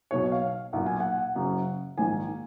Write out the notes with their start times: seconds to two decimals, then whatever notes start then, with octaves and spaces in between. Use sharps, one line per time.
0.11 B1 B2 C#5
0.32 F5
0.73 B1 A#2 F#5
0.86 G#5
1.00 F#5
1.35 F#1 F#2 C#3
1.98 A#1 G#2 D#3 G#5